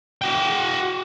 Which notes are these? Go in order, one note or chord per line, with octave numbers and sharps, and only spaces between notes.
F#4 G5